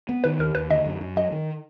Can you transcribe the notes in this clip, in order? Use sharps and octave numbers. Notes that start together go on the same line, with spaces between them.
B3
D#3 B4
D#2 A#4
D#2 B4
D3 D#5
F#2
F#2
F#3 D#5
D#3